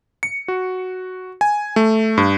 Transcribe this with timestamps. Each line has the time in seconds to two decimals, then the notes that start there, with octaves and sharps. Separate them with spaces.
0.23 C#7
0.48 F#4
1.41 G#5
1.76 A3
2.18 G2